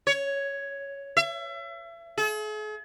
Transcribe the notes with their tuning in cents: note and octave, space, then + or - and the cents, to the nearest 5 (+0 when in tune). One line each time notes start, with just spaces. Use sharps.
C#5 +5
E5 +35
G#4 +45